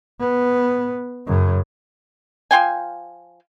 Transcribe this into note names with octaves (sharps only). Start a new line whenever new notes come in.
B3
F#2 C#3
F3 F4 G5 G#5